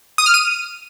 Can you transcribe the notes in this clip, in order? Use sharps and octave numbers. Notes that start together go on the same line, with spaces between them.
D#6
F6
D#7